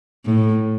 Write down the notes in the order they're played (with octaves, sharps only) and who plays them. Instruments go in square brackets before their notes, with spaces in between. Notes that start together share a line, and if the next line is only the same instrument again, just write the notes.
[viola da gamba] A2